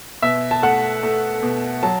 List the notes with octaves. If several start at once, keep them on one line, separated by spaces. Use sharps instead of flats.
B2 E5
A5
A3 F#5
A3
B2
F#3 A5